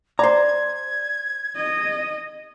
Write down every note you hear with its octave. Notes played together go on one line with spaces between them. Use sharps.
C5 D5 A#5 G#6
D#5